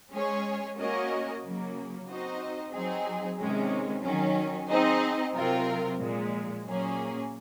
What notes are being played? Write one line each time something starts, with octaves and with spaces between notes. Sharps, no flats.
G#3 C#4 G#4 C#5
A#3 C#4 F#4 A#4 D#5
C#3 F#3 A#3
C4 D#4 F#4 C5 D#5
F#3 C4 D#4 G#4
C3 D#3 G#3 C#4
D#3 F#3 C#4
C4 D#4 G#4 C5 D#5
C3 F#3 C4 F4 A#4
A#2 F3 G#3
A#2 F#3 A#3 C#4 G#4